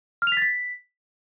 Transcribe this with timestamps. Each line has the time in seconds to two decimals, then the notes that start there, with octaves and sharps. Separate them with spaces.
0.22 F6
0.27 F7
0.32 B6
0.37 A6
0.42 B6